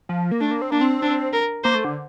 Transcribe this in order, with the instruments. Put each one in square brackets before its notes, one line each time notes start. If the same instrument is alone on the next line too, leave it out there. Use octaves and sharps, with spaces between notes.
[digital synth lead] F3
A#3
[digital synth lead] A3 [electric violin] D4
[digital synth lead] A#3
C4
[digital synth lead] A#3 [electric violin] D4
[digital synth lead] C4
[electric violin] D4
A#4
[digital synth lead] A#3 [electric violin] C5
[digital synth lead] A3
D3